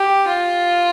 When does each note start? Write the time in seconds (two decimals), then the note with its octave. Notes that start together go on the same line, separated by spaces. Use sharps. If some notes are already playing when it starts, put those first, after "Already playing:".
Already playing: G4
0.28 F4